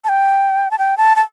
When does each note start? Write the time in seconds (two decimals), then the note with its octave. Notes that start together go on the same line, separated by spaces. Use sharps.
0.04 A5
0.09 G5
0.71 A5
0.79 G5
0.97 A5
1.16 A5